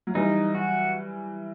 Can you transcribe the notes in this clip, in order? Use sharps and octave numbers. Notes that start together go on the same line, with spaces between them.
F#3
E3 G3 D#4
F#4